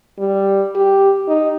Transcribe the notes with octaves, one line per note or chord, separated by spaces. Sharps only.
G3
G4
D#4